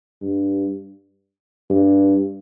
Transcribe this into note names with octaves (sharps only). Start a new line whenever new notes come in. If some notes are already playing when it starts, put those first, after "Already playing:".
G2
G2